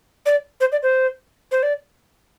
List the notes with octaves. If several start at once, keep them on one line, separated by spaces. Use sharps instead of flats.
D5
C5
D5
C5
C5
D5